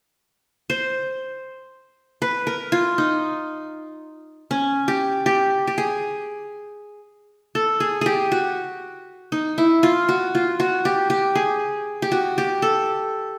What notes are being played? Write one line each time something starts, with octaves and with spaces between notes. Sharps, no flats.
C5
B4
A#4
F4
D#4
C#4
G4
G4
G4
G#4
A4
G#4
G4 G#4
F#4
D#4
E4
F4
F#4
F4
F#4
G4
G4
G#4
G4
F#4
G4
A4